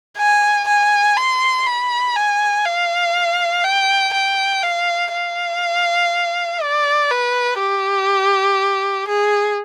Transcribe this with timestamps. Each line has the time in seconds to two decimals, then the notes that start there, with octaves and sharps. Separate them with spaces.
0.18 G#5
0.68 G#5
1.17 C6
1.67 B5
2.16 G#5
2.65 F5
3.64 G5
4.14 G5
4.63 F5
5.12 F5
6.62 D5
7.11 B4
7.60 G4
9.08 G#4